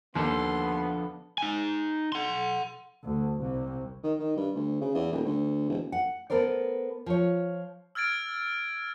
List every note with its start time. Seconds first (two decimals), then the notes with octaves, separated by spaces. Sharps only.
0.15 D#2 F3 B3 D4 A4 C6
1.38 D#4 G#5
2.12 F#5 C6
3.04 D2
3.41 C2
4.03 D#3
4.19 D#3
4.36 G2
4.55 D2
4.81 C#3
4.95 E2
5.12 D#1
5.25 D2
5.69 E1
5.92 F#5
6.30 B3 A4 A#4 C5 D5
7.06 F3 C#5
7.95 E6 F6 G#6 A6 D7